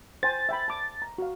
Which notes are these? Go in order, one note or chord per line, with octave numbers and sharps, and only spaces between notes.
C5 G5 G#5 A6
E5 G5 B5
A5 D6
A#5
F#4 F5